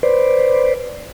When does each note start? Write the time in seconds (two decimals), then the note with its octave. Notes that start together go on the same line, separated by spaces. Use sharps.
0.03 B4 C5 D5